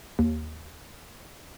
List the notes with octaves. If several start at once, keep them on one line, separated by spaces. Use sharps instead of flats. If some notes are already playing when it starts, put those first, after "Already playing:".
D#2